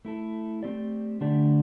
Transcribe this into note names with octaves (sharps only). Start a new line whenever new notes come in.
A3 E4 A4
A3 C4 G4 D5
D3 A3 D4 G4 D5